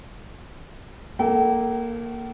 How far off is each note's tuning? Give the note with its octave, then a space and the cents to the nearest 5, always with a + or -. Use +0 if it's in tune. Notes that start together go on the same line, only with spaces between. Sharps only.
A#3 +0 A4 -15 G5 -45